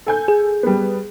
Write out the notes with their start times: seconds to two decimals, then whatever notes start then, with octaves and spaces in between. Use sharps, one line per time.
0.07 A4 G#5 G6
0.28 G#4
0.63 G3 B3